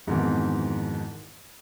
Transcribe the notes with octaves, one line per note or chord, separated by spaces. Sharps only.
F2 G#2 B2 D#3 E3